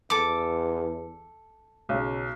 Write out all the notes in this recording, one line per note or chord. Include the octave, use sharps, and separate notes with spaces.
E2 A4 D6
B1 C#3